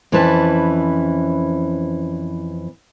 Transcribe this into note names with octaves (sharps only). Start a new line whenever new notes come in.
F2 E3 C#4 E4 B4 A5